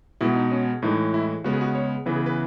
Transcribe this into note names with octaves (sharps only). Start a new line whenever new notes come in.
B2 G#3 B3 E4
D#4
C#4
A2 E3 G#3 D#4
E4
C#3 G#3 B3 F#4
G#4
F#4
C#5
C#3 E3 B3 B4
G#4
B4